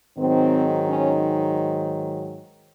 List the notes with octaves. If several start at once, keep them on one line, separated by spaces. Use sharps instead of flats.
G#2 D#3 F#3 C4
C#4